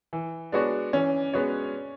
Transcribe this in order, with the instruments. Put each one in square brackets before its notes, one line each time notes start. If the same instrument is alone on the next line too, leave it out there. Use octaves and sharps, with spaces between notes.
[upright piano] E3
[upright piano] G#3 B3 F#4 C#5 [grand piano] D4
[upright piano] E3 [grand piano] C#4
[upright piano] G#3 B3 F#4 C#5